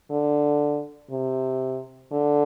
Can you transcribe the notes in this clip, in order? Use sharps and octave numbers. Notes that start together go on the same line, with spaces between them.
D3
C3
D3